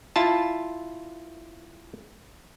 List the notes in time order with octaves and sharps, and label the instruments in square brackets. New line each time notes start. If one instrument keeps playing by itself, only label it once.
[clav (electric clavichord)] E4 F4 A5